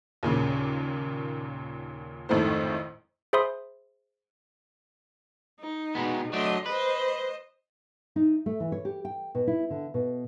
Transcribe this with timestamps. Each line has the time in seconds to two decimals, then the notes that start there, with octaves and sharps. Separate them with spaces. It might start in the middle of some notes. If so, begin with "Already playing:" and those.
0.23 D#2 A#2 C#3 A#3
2.29 G#1 F2 A2 D#3 A3 C5
3.33 G#4 C5 E5 B5 C6 D#6
5.60 D#4
5.95 B2 G#3 B3
6.33 F#3 A3 D4 D#5 C6
6.66 B4 C5 D#5
8.16 D#4
8.46 A3
8.60 E3
8.72 C#5
8.85 G4
9.05 G5
9.35 B2
9.47 E4
9.70 D3
9.94 B2